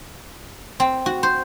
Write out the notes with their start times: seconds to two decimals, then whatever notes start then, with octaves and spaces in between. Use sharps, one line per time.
0.80 C4
1.06 F#4
1.23 C5